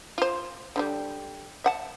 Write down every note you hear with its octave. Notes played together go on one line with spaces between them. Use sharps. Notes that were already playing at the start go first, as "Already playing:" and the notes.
F4 C5
D3 F#3 G3
E5 F#5 A5